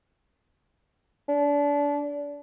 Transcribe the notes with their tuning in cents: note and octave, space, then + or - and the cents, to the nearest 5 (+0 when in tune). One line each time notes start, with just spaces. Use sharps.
D4 -30